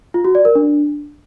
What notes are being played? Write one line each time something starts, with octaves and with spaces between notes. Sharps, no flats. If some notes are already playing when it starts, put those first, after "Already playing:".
F4
F#4
D5
A#4
D4